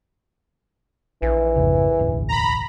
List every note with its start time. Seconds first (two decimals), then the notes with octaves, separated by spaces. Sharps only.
1.22 A#1 E3
1.56 F2 G#2 C#3
1.99 E1 A1 D2
2.29 A#5 B5